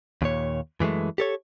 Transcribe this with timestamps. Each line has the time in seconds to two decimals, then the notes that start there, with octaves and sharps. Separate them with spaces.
0.22 D#2 A#2 C#5
0.80 F#2 E3 G#3 A3
1.18 G4 A4 C#5